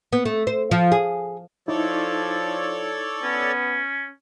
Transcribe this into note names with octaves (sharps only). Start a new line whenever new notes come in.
B3
A3
C5
F3
G#4
F3 D#4 E4 A4 C#5 D5
B3 C#4